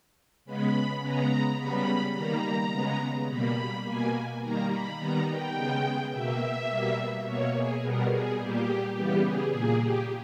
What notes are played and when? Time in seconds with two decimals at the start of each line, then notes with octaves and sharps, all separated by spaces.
0.45 C#3 G#3 B3 B5
1.01 C#3 G#3 B3 A#5
1.58 C#3 G3 B3 B5
2.15 D#3 G3 A#3 A#5
2.72 C#3 G#3 B3
3.29 B2 G3 A#3 B5
3.85 B2 A#3 G#5
4.42 D#3 G3 A#3 A#5
4.70 B5
4.99 D#3 G3 B3 A#5
5.27 G5
5.56 C#3 G#3 B3
6.12 B2 A#3 E5
6.68 B2 G3 A#3
7.25 B2 A#3 C#5
7.54 G#4
7.82 B2 G3 B3 A#4
8.11 G#4
8.38 A#2 G3 A#3 G4
8.95 C#3 E3 G3 B3 G4
9.24 G#4
9.52 A#2 A#3 G#4
9.80 G4